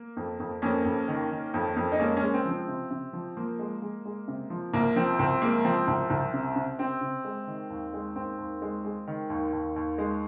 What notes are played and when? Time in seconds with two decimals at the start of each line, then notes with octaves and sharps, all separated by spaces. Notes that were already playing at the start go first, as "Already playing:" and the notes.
Already playing: A#3
0.17 F2
0.40 F2
0.62 F2 A#3 C#4
0.85 F2
1.08 D#3
1.31 D#3
1.54 F2
1.77 F2
1.92 D#4
1.99 G#3 A#3 C#4
2.16 A#3 C#4
2.22 G#3
2.34 C4
2.45 F3
2.51 C4
2.68 C3
2.91 C3
3.13 F3
3.37 F3 A#3
3.59 G#3
3.82 G#3
4.05 G#3
4.28 C3
4.50 F3
4.73 C2 A#3
4.96 F3 C4
5.19 C2 C4
5.42 G#3 A#3
5.65 F3 C4
5.87 C2 C4
6.10 C2
6.34 C3
6.56 C3
6.79 C3 C4
7.01 C3
7.25 G#3
7.47 D#3
7.70 D#2
7.93 G#3
8.16 D#2 C4
8.38 D#2
8.62 G#3
8.85 G#3
9.08 D#3
9.30 D#2
9.53 D#2
9.76 D#2
9.98 G#3